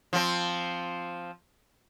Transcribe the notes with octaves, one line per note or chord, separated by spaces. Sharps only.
F3 C4